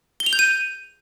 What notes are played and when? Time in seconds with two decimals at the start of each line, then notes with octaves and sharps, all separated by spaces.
0.20 G7
0.26 F7
0.33 G6
0.39 D#7